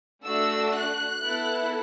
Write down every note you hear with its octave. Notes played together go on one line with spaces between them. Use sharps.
A3 D4 F#4 E6
F#6
B3 E4 A4